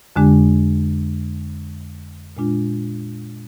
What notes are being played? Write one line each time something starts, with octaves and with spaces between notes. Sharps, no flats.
F2 D3 G#3 D4 G4
A#2 G#3 D4 F4